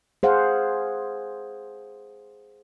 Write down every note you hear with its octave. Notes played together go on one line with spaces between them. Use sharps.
G#4 C5 F5 F#5